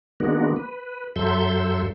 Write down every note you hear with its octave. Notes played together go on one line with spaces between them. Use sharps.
D#3 G#3 A#3 B3 D4 F#4
B4
F#2 F#3 A4 E5 C6 G6